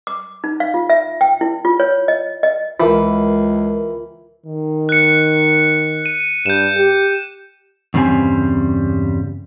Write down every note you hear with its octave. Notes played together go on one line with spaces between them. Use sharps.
D6
D#4
F5
F4
E5
G5
E4
F4
C#5
D#5
D#5
C#2 E3 F4 A#4
D#3
F#6 C#7
D#7
G2 G6 E7
G4
E2 G2 C#3 G3 C4 G#5